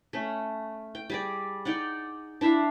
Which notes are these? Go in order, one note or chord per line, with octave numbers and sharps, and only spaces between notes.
A3 C#4
G5
G3 G#4 D5
D#4 D5 F#5
D4 E4 E5 F5